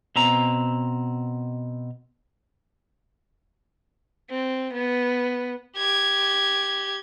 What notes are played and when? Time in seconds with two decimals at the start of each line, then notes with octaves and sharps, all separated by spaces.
0.16 B2 C4 A#5
4.30 C4
4.73 B3
5.77 G4 G#6